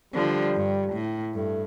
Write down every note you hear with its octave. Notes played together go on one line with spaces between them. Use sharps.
D3 F3 G3
G2
A2
G2 A3